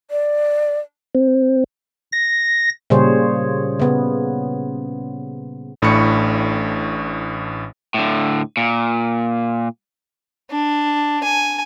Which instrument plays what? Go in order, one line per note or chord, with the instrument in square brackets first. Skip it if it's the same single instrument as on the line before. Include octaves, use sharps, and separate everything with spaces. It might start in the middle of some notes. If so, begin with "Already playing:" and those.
[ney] D5
[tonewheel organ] C4
[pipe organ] A#6
[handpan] A#2 C#3 G3 G#4 C5 C#5
C#3 B3
[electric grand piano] A1 A2 D4 B5 C#6 C#7
[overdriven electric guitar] A2 D3
A#2
[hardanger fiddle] D4
G#5